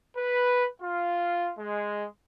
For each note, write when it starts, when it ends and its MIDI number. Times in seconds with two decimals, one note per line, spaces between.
0.17 0.66 71
0.82 1.51 65
1.58 2.06 56